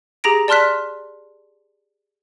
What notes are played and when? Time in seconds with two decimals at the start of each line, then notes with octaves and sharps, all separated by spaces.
0.24 G4 G#4 A#5 A#6 D7
0.48 D5 A5 C6 F6 F#6 B6